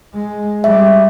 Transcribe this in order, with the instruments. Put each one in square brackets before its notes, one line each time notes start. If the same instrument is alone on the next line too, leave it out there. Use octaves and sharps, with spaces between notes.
[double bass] G#3
[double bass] G3 [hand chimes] E5